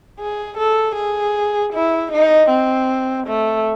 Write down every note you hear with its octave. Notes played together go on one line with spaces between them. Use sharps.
G#4
A4
G#4
E4
D#4
C4
A3